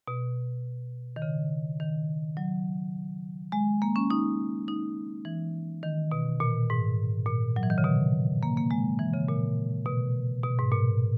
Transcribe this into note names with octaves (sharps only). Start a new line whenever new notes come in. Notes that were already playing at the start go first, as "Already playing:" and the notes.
B2
D#3
C#3
D#3
F#3
G#3
A#3
C#4
D#4
D#4
E3
D#3
B2
A#2
G#2
A#2
F#3
E3
D#3
C#3
B2
A#3
A#3
G#3
E3
C#3
A#2
B2
B2
G#2
A#2